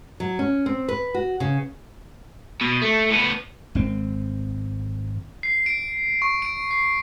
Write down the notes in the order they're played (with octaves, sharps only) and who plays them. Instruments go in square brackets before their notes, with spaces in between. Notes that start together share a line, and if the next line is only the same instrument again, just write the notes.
[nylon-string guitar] F#3
C#4
C4
B4
F#4
C#3
[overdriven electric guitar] B2
A3
A2 B3
[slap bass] G#1 C4
[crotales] C7
D7
C#6
D7
C7